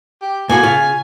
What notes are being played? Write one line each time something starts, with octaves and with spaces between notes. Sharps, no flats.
G4
A2 A#3 F#4 G#5
C#3 F4